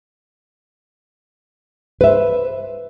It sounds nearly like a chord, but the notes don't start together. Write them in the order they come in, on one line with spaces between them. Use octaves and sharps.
B4 E5 C5